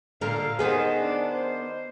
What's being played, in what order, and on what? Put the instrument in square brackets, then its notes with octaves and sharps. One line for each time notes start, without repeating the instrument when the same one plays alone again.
[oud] A#2 D3 A#4 [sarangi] F5
[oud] D#3 B3 G#4 [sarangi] C5
[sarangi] D4
C5